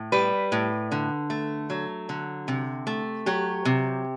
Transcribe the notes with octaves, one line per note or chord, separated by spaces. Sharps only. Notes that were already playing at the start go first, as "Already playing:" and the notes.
Already playing: A2
G3 B4
A2
D3
A3
F#3
D3
C3
A3
F#3 G4
C3